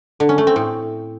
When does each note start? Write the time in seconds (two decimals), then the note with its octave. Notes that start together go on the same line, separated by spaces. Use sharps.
0.20 D3
0.29 C#4
0.38 A3
0.47 C4
0.56 A2